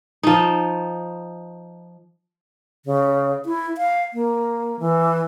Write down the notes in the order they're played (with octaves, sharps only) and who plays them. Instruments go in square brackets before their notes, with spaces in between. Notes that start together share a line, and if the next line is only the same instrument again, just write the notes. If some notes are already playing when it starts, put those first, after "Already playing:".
[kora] F3 D#4
[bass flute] C#3
E4
F5
A#3
E3